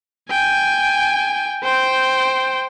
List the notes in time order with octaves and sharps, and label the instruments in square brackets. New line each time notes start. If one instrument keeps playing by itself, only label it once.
[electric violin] G5 G#5
C5 G5